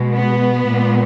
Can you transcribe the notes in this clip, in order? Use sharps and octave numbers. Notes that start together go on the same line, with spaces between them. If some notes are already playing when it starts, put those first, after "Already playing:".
Already playing: B2 G#3
B3
A#2 G#3